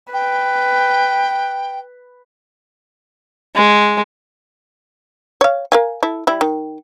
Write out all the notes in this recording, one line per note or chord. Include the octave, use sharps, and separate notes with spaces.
B4 G5
G#3
C#5 F5
A#4 F5 G#5
E4 A4
G3 E4
D#3